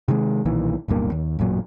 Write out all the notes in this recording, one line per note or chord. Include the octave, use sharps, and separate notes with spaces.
C3 D#3 F#3 G#3
B1 A#2 D#3 E3
D1 B1 G2 A#3
D#2
A1 F#2 A#2 F#3